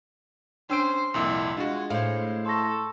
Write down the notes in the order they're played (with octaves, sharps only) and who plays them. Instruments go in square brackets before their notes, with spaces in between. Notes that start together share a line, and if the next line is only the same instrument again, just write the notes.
[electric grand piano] C#4 E6 D7 [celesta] D4 G5 [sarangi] C5
[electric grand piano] C2 F2 A#2 [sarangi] E4 [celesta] C6
[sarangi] G#3 [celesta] D4 [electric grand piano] F4 F#4
[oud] A2 [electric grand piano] C5 F5
[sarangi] A4 [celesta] C6 C#6 A#6